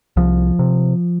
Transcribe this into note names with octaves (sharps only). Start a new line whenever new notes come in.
C2 F3
C3